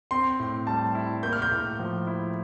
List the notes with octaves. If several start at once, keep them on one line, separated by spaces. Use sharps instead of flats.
C4 C6
A2
G3 A5
E4
A#3 G6
F6
G6
A2
F3
E4